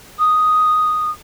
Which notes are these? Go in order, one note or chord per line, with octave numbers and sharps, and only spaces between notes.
D#6